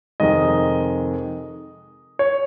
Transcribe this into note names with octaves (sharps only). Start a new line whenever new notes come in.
F2 C3 D#3 G#3 D#5
C#5